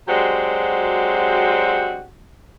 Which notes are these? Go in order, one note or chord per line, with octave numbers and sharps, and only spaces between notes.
F#3 G#3 C4 D4 F#4 G4